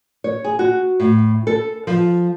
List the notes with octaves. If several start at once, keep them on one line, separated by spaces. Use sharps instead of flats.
C#5
G#4
F#4
A2
A4
F3